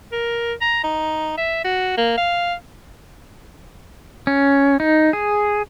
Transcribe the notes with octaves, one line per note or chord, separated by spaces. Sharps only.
A#4
A#5
D#4
E5
F#4
A#3
F5
C#4
D#4
G#4